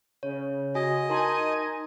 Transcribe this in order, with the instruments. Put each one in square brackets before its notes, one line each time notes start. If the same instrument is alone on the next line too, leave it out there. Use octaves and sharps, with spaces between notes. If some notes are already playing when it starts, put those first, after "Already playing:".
[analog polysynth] C#3 [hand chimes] C#5
[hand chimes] F#4 G#5 [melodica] D#5
[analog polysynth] D#4 G#5 D#7 [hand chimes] A#4 A5 C6